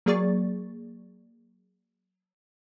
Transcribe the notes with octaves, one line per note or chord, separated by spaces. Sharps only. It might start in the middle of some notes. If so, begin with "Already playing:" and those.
F#3 A#3 G#4 D5 C#6 A6